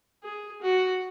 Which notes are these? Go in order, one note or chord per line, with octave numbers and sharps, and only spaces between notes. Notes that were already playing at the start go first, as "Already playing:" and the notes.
G#4
F#4